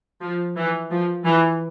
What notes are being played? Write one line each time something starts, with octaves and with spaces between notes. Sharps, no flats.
F3
E3
F3
E3